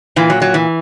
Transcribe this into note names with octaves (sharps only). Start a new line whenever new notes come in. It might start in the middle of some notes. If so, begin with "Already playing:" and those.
A#2 E3
F#3
F#3
E3